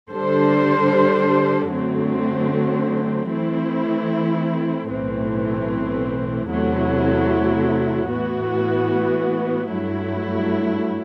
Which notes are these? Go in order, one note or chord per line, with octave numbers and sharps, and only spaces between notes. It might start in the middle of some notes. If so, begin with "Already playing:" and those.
D3 G3 D4 A4 C5
F#2 D3 F#3 A3 C4
E3 A3 C4 E4
B1 A2 E3 A3 C4
E2 C3 F#3 A3 E4
A2 E3 B3 F#4
G2 F#3 A3 E4